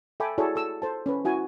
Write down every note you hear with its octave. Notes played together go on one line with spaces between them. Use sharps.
A4 E5 G5 G#5 B5 D6
E4 F#4 G#4 A4 C#5 D5
A4 E6
A4 C5 A5
C#4 B4
E4 F#4 G#5